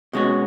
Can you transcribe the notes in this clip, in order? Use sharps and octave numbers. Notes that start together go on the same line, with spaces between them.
B2 G#3 C#4 F#4